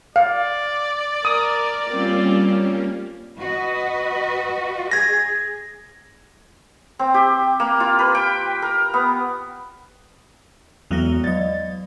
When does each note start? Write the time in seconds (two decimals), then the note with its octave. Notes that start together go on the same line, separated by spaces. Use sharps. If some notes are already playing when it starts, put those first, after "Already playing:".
0.16 D5 F5
1.25 A#4 D#6
1.90 G3 A#3 C4 C#4 F4
3.38 F#4 B4 D#5
4.91 G#4 G#6 A#6
6.99 C4
7.14 G4
7.60 A#3
7.80 F4
7.99 B4
8.15 G5
8.62 A#4
8.94 B3
10.91 E2 E3 F#3 G#3 B3 A#6
11.24 F#3 D5 D#5 A6